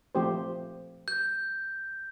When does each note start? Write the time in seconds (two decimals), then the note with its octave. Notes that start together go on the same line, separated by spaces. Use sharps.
0.15 F3 A3 C4 G4 C5
1.08 G6